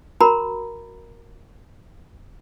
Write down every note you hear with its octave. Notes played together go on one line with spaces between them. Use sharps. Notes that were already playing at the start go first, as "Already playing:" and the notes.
F#4 A#4 A#5 B5